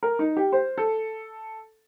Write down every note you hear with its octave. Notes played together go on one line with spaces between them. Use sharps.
A#4
D#4
G4
C5
A4